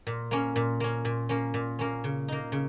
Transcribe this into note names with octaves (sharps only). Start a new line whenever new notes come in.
A#2
A#3 C#4
A#2
A#3 C#4
A#2
A#3 C#4
A#2
A#3 C#4
C#3
A#3 D#4
C#3